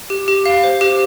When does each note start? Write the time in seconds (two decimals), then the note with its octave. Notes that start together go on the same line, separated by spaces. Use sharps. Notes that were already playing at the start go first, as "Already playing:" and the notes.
0.10 G4
0.28 G4
0.46 F5
0.63 C5
0.81 G4